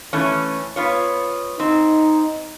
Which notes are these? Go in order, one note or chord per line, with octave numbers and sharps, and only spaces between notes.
E3 A3 C#4
B3 F4 C#5
C4 D#4